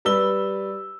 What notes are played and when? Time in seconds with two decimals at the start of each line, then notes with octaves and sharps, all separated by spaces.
0.05 G3 B4 E6 G7